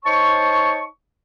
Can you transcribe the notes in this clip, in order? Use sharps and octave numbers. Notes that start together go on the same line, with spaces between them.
D#4 C5 C#5 A5 C#6